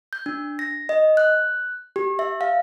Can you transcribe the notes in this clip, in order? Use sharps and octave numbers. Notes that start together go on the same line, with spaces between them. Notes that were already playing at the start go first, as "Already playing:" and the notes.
G6
D4
A#6
D#5
F#6
G4
E5
F5